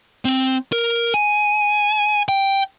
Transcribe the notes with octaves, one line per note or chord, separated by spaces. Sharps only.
C4
A#4
G#5
G5